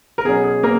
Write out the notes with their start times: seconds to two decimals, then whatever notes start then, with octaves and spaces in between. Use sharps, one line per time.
0.18 A#4
0.25 B2 F#3 C#4 G#4
0.44 G#4
0.63 A#3 A#4